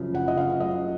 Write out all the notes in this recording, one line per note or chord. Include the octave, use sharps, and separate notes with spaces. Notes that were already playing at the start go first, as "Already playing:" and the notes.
Already playing: F#2 C#3 F3
F#1 F#5
D#5
C#3 F5
F#2 D#5